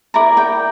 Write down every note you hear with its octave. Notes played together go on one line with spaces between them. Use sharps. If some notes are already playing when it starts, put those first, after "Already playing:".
E4 A#4 D5 A#5
G5